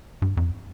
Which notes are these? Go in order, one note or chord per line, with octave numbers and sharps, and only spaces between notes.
G2
F2